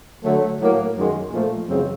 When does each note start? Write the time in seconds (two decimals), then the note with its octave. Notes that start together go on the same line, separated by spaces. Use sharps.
0.24 D3 F#3 A3
0.60 A2 F#3 A#3
0.96 F#2 D#3 G#3
1.32 A#2 F3 A3
1.68 F#2 C#3 E3 G#3 C4